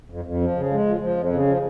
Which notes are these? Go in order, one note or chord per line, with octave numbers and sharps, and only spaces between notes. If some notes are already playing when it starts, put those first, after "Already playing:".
F2
F2
F3
C#3
G#3
F3
F3
F2
C#3
F3